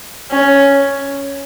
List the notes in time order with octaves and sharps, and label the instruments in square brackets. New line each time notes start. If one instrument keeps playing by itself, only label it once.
[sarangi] C#4